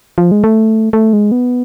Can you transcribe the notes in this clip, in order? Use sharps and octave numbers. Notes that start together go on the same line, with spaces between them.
F3
G#3
A3
A3
G#3
B3